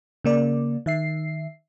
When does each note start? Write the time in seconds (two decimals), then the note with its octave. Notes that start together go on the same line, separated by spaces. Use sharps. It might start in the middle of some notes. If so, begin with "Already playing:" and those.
0.24 C#3 A#3 D5
0.86 D#3 E5 C7